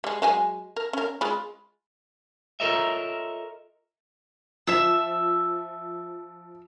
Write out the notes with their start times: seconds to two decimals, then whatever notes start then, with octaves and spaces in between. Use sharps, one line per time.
0.04 G3 G#3
0.22 F#3 G#3 G#5
0.76 A#4
0.93 C#4 A#4
1.21 G#3 F4 B5
2.60 F4 A4 A#4 C#5 D#5 E5
4.67 F3 E5 E6